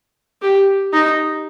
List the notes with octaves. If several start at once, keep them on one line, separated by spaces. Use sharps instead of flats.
G4
D#4